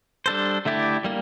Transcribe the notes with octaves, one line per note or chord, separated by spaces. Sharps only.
G3 D4 A4 C5
D3 A3 E4 G4 D5
G3 A#3